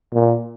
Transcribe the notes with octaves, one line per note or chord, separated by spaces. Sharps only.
A#2